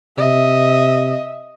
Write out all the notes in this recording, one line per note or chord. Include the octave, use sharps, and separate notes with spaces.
C3 D#5 E5